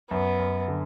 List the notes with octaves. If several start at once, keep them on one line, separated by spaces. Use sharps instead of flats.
F#2 B3
F#2
D3